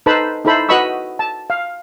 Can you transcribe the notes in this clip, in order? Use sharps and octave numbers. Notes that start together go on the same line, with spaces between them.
D#4 A4 B4 C5 A5 B5
D#4 E4 A4 C5 B5
F#4 B4 D#5 B5 C#6 E6
A5
F5